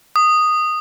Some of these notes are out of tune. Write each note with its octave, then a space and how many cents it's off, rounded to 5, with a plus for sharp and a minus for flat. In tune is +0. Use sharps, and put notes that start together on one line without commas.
D#6 -10